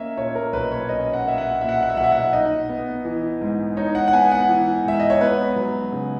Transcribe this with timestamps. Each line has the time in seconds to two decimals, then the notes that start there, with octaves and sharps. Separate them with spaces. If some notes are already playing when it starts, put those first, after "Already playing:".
Already playing: A#3 C#4 C#5 D#5 E5
0.17 A#2 C#5
0.35 A#4
0.53 B1 B4
0.72 C#5
0.89 C#4 D#5
1.13 F#5
1.25 A#3 E5
1.38 F#5
1.61 A#2 E5
1.69 F#5
1.76 E5
1.83 F#5
1.90 E5
1.97 B1 F#5
2.04 E5
2.12 F#5
2.19 E5
2.33 D#4 D#5
2.69 B3
3.05 E3
3.41 G#2
3.77 D#4 C#5
3.95 F#5
4.08 F#5
4.13 B3 G#5
4.32 F#5
4.49 E3
4.86 G#2 E5
5.00 D#5
5.10 C#5
5.21 B3 B4
5.56 F#3
5.92 C#3